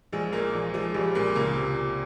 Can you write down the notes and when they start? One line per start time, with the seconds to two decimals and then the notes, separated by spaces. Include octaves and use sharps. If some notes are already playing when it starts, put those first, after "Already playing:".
0.13 A#1 G#3
0.32 A#2 A#3
0.54 A#1
0.74 F3 G#3
0.94 A#1 G3
1.15 A#2 G#3
1.35 C#2 A#3
1.55 C3